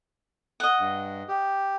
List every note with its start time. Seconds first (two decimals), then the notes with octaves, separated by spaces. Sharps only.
0.60 D#5 F#5
0.79 G2
1.28 G4